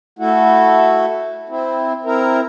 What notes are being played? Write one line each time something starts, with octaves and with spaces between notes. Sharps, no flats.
A3 E4 F#4
C4 E4
C4 E4 A#4